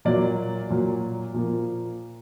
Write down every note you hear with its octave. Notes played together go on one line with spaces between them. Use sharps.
A#2 F#3 A#3 D5
A#2 F#3 A#3
A#2 F3 A#3